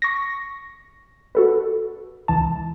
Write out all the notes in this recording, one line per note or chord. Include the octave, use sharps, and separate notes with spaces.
C#6 A#6
F#4 A4 B4
C#2 E3 A5